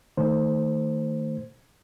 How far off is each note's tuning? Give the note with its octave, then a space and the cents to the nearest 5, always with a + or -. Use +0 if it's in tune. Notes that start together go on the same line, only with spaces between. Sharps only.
D#3 +0 A3 +25 C5 +0